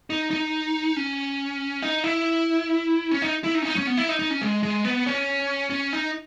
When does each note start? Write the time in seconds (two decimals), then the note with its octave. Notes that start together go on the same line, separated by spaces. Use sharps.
0.10 D#4
0.31 D#4
0.96 C#4
1.82 D#4
2.04 E4
3.11 C#4
3.22 D#4
3.44 E4
3.55 D#4
3.62 C#4
3.65 D#4
3.76 C#4
3.87 B3
3.97 E4
4.09 D#4
4.19 D#4
4.30 C#4
4.41 G#3
4.63 G#3
4.85 B3
5.06 C#4
5.70 C#4
5.93 D#4